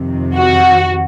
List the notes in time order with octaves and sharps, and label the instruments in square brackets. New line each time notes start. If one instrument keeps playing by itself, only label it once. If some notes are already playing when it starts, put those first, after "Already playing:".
Already playing: [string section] F2 C3 D#3
F#4